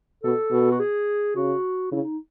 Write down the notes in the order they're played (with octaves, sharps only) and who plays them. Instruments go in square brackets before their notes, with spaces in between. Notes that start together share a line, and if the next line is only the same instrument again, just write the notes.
[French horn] B2 [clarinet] A4
[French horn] B2
[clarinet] F#4
G#4
[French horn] C#3 [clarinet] F#4
[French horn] C#3 [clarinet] E4
[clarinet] D#4